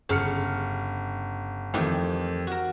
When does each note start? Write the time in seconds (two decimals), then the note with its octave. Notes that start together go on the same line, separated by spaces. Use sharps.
0.09 G1 C#3 F6 C#7
1.74 F2 D#3 E3 A3 G4
2.47 F#4 A#4